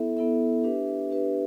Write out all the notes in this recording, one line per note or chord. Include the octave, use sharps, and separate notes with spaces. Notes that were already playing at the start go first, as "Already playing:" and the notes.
Already playing: B3 E4 A4 E5
B3 E4 A4 E5
D4 G4 B4 E5
D4 G4 B4 E5